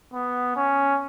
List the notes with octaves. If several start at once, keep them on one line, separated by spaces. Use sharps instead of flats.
B3
C#4